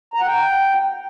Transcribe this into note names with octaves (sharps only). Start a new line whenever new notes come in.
A#5
F#5
G5